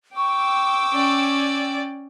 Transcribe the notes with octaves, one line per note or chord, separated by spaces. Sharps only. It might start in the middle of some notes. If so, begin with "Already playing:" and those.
G5 C#6 D6 E6
C#4 D5